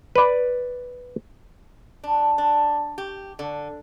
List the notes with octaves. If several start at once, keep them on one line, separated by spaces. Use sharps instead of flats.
B4 D5
D4
D4
G4
D3